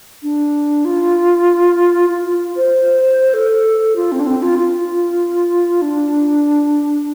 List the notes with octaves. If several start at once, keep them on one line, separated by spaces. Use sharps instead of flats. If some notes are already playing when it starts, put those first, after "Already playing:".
D4
F4
F4
F4
C5
A4
F4
C4
D4
C4
F4
F4
D4